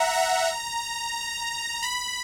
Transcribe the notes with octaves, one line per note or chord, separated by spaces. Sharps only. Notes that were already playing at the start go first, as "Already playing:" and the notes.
Already playing: E5 F#5 A#5
A#5
B5